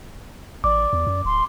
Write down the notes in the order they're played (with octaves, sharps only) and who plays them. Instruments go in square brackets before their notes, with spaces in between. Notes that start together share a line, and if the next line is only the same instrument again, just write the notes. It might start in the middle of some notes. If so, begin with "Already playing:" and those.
[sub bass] A1 [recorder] D5 [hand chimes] D6
[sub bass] E2
F#2
[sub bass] D1 [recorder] C6